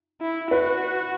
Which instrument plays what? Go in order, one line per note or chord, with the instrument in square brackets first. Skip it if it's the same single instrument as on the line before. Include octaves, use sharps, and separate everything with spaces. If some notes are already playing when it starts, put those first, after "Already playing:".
[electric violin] E4
[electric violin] F#4 [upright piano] B4